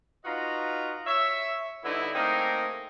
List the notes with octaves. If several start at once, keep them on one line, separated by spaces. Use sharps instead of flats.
D#4 F4 F#4 B4 D#5 A#5
C#5 E5
G2 D3 B3 D#4 E4
A3 A#3 C4 D#4 G#4 A#4